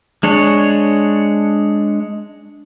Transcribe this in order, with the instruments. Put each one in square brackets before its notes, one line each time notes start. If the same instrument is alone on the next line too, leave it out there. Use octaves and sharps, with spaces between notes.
[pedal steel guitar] G#3 D4 C#5